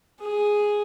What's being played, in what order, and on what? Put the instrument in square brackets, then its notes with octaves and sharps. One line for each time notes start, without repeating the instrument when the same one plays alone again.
[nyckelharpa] G#4